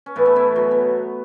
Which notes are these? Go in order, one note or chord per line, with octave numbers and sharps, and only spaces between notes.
C#4
A2 E3 B3
A3 C#4
B3 E4
B2 F#3
B3